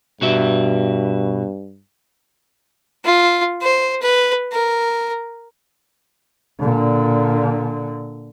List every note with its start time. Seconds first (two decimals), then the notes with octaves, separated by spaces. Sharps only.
0.21 G2 B2 F#4 E5
3.05 F4
3.61 C5
4.02 B4
4.52 A#4
6.60 A#2 D3